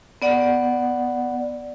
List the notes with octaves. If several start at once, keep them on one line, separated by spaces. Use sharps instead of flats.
B3 D5 F#5